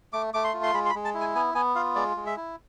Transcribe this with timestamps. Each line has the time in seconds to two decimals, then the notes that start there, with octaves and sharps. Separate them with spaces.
0.13 A3 D6
0.34 A3 D6
0.44 C6
0.54 F4
0.63 C6
0.74 G#3 B5
0.86 C6
0.90 B5
0.95 G#3
1.05 A5
1.14 E4
1.20 G#5
1.35 B3 G#5
1.55 B3 G#5
1.75 F4 F5
1.95 G#3 D5
2.17 G#3
2.26 E5
2.37 E4